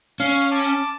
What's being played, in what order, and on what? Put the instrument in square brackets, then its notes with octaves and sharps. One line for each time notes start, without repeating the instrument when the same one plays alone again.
[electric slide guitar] C#4 [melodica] F5
[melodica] A5 D6